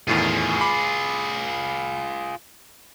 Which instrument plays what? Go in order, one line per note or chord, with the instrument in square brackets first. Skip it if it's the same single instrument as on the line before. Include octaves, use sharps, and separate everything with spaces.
[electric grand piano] E2 A2 D#3 [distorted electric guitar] F4 G#4
[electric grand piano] B5 D6